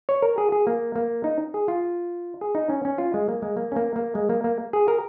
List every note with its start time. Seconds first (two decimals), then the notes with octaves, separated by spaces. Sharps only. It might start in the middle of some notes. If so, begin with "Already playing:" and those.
0.09 C#5
0.22 A#4
0.38 G#4
0.52 G#4
0.67 A#3
0.96 A#3
1.24 D#4
1.54 G#4
1.68 F4
2.41 G#4
2.55 D#4
2.70 C#4
2.85 C#4
2.98 F4
3.14 G#3
3.28 A#3
3.42 G#3
3.57 A#3
3.72 C#4
3.76 A#3
3.96 A#3
4.15 G#3
4.29 A#3
4.44 A#3
4.73 G#4
4.88 A#4